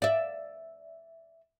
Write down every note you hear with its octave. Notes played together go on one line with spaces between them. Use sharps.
D5 E5